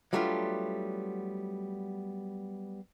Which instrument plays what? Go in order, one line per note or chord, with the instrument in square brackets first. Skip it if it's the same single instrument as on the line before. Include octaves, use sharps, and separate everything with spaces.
[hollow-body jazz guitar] F#3 G3 A3 B3 D4 F4